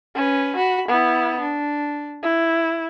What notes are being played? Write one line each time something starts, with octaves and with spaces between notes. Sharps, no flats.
C#4 B4
F#4 B5
B3 E4
D4
E4